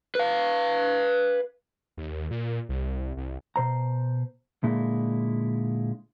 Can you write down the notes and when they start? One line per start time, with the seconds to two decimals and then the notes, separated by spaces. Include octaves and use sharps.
0.15 B4 F5
1.97 D#2
2.31 A#2
2.69 C2
3.17 C2
3.56 B2 C5 A#5
4.64 A#2 D3 G#3 E4